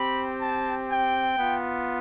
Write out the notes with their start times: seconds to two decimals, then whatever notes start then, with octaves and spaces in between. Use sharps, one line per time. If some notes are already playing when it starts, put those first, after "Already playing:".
Already playing: C4 G4 B5
0.41 A5
0.90 G5
1.38 B3 F4